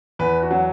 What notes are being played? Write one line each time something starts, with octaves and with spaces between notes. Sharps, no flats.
E2 B4
F#4
F#3